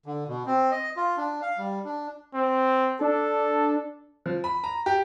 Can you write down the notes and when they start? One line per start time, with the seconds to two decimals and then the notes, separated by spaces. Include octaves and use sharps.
0.06 D3
0.28 B2
0.46 C4
0.71 D#5
0.97 F4
1.17 D4
1.42 F5
1.58 G3
1.85 D4
2.34 C4
3.01 D4 A4
4.26 F3
4.44 B5
4.64 A#5
4.86 G4